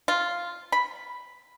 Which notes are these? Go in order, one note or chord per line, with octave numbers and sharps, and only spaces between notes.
F4
B5